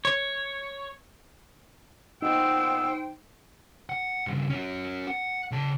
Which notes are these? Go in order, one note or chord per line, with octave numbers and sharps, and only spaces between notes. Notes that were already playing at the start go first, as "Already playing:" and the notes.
C#5
A#2 B3 D#4 C5 G5 E6
F#5
G2 C#3
C#4 F#4
F#5
C#3 A5